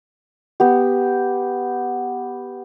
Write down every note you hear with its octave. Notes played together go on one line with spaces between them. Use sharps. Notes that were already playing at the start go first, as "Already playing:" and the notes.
B3 G4